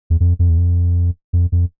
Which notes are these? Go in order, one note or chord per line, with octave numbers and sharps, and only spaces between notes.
E2
F2
F2
E2
F2
F2
F2